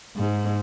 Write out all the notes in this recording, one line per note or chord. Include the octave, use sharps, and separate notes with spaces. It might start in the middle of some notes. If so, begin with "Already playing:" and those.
G#2